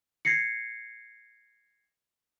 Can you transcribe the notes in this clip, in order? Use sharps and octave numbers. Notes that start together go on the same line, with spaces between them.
G#6 A#6 C7 C#7